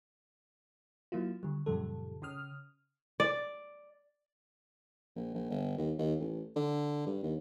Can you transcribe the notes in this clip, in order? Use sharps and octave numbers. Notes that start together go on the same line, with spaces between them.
F#3 A#3 E4 F4
D3 G3
F#2 A#2 C#3 F3 G3 A4
C#3 C#4 D#6 F6
D5
A#1
A#1
G1
D#2
D#2
A1
D3
G2
D#2